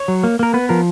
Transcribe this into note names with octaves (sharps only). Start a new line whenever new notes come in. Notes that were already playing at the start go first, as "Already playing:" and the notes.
Already playing: C#5
F#3
A#3
A#3 A#4
B3 B4
F3 A#4